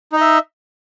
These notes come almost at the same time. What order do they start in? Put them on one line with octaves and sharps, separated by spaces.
D#4 D#5 E5